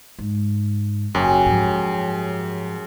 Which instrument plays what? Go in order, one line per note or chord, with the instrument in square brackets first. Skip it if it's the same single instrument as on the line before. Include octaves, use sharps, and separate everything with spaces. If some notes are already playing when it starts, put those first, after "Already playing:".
[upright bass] G#2
[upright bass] F#1 [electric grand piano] F#2 [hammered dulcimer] F#3 G4 G#4
[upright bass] G#2 F3